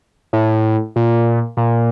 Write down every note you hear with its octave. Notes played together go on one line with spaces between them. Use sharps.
A2
A#2
A#2